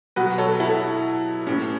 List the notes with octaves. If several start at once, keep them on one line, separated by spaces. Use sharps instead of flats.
B2 F#3 B3 F#4 B4
A4 C#5
E4 A4
A2 E3 C#4